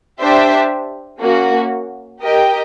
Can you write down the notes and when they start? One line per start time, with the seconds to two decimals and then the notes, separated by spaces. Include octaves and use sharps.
0.19 D4 G4 C5 E5
1.19 A#3 C#4 F#4
2.20 G4 A#4 D#5 G5